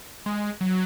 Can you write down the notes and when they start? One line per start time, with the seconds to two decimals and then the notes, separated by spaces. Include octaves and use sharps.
0.26 G#3
0.61 F#3